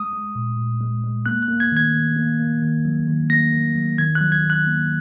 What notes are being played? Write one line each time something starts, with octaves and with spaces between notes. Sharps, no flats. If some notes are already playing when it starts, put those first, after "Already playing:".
Already playing: G#3 D#6
G#3
A#2
A#2
G#3
G#3
A#3 F#6
F#6
A#3
G#6
D#3 G#6
D#3
A#3
A#3
D#3
F#3
D#3
A#3 A#6
D#3
F#3
D#3 G#6
F#6
F#3
G#6
D#3
F#6
A#3